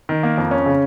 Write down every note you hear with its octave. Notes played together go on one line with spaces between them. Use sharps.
D#3
A#3
F2
C#4
C#3